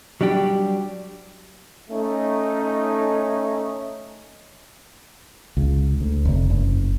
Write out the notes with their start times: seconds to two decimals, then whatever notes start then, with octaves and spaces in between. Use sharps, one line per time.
0.21 F#3 G3 D4 G4
1.90 A3 C#4 D#4
5.57 C#2
6.00 D2
6.25 F1
6.50 F#1